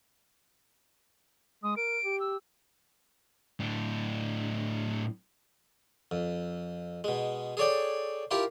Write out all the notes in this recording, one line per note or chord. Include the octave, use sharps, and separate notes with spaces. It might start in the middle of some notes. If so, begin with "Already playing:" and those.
G#3 D#6
A#4 D7
G4
E6
A2 D4
F2
B2 G#3
G#4 A4 C#5 D5 G5
E4 F4 G4 A#4